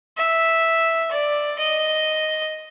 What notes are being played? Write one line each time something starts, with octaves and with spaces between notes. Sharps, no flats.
E5
D5
D#5